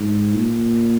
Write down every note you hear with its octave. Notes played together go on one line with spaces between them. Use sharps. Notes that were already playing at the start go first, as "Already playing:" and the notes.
Already playing: G#2
A#2